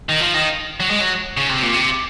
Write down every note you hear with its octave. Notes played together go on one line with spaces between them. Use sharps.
D#3
F3
D#3
F#3
G#3
F#3
C#3
C3
A#2
C3